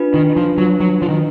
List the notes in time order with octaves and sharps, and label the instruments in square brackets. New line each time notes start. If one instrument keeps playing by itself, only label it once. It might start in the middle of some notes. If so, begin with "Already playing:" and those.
Already playing: [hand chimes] D4 F4 B4
[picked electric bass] D#3
F3
F#3
F#3
F3
D#3